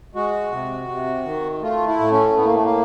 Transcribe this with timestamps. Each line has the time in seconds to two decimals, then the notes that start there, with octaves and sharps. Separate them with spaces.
0.15 G#3 F#4
0.52 C3
0.88 C3
1.25 D#3
1.62 A3 F4
1.87 E4
1.99 A2
2.12 C#4
2.36 A2 B3
2.45 A#3
2.54 A3
2.64 A#3